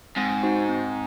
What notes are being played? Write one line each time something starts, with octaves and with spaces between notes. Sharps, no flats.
G#2 C4
D#4 F#4 C5
C4